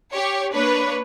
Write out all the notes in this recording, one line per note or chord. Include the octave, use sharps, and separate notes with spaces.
G4 C#5
A#3 D4 B4 C#5